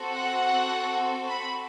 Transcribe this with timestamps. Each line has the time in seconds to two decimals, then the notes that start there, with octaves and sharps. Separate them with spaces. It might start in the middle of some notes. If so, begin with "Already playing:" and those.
Already playing: C4 F#4 A4
0.15 F#5
1.27 B5